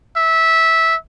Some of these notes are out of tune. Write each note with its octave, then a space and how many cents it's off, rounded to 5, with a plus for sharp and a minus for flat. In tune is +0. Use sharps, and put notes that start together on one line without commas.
E5 -15